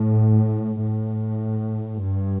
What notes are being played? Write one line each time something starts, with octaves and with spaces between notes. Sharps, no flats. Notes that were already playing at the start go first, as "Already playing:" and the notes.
Already playing: A2
A2
G2